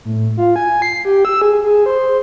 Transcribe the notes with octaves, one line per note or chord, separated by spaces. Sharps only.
A2
F4
G#5
C7
G4
E6
G#4
G#4
C5